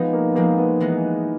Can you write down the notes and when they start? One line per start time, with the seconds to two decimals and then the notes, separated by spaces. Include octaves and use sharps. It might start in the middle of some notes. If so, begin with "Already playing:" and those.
Already playing: F3 G#3 B3 C4 D#4
0.13 A#3
0.32 B3
0.36 F3 G#3 A#3 C4 D#4
0.58 B3
0.80 E3 G#3 B3 D#4